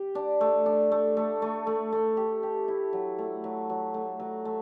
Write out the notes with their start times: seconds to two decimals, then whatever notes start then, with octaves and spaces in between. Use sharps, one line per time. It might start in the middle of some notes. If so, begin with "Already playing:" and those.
Already playing: G4
0.15 D4
0.41 A3
0.66 D4
0.92 A3
1.17 A3
1.42 A3
1.67 A3
1.92 A3
2.17 G4
2.43 G4
2.68 E4
2.93 F#3
3.18 A3
3.44 F#3
3.70 F#3
3.94 A3
4.20 F#3
4.45 A3